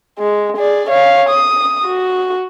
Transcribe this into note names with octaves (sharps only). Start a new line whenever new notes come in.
G#3
G#4 D5
C#5 F5
D#6
F#4